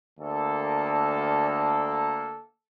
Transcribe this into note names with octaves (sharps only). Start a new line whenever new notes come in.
D2 A#3 A4